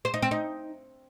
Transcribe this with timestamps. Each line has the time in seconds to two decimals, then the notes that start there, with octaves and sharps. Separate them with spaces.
0.05 C5
0.14 D#4
0.22 C4
0.31 D#4